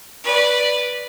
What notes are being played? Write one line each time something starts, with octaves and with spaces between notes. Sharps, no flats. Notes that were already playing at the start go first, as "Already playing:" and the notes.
B4 D5